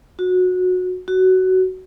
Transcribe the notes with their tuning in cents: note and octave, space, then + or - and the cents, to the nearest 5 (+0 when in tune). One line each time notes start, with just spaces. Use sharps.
F#4 -20
F#4 +15